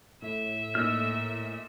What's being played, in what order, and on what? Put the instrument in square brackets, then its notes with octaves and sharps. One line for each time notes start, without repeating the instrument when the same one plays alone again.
[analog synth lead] A2 [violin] E5
[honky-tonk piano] A#2 D#4 [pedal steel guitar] E6 F6